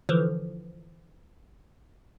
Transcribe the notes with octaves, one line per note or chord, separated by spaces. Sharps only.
D3 E3 F3